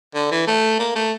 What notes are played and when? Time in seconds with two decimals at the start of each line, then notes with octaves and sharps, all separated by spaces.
0.15 D3
0.31 E3
0.47 A3
0.79 A#3
0.95 A3